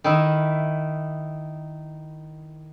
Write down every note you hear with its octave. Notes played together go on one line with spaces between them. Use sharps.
D#3 E4 E5